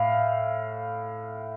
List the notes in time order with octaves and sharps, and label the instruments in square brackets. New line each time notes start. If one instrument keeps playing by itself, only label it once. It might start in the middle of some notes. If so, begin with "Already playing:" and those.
Already playing: [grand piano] A2 F5